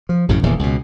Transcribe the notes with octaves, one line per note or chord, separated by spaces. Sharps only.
F3
A1 F#2 A2 C#3
D#1 E2 A#2 C#3
C#2 B2